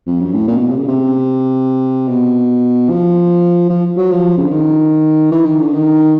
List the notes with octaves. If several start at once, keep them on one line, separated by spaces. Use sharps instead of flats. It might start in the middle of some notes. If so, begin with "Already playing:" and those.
F2
F#2
A2
A#2
B2
C3
C#3
C3
B2
F3
F3
F#3
F3
C#3
D3
D#3
E3
D#3
D3
D#3